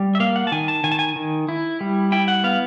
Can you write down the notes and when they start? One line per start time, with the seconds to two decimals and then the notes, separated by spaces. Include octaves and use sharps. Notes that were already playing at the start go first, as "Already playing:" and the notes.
Already playing: G3
0.15 E5
0.20 A#3 F5
0.36 F#5
0.47 A5
0.52 D#3 G#5
0.68 A5
0.84 D#3 G#5
0.92 A5
0.99 G#5
1.16 D#3
1.49 E4
1.81 G3
2.12 E4 G5
2.28 F#5
2.44 B3 F5